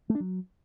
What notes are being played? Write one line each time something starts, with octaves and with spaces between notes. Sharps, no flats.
A3
D4
F#3